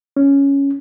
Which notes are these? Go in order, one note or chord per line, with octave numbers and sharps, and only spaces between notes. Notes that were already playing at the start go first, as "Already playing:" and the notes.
C#4